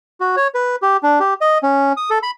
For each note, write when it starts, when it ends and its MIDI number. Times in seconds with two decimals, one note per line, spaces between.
0.20 0.36 66
0.37 0.48 73
0.54 0.76 71
0.82 0.97 67
1.03 1.19 62
1.20 1.34 67
1.41 1.58 75
1.63 1.93 61
1.97 2.10 87
2.10 2.19 69
2.23 2.31 83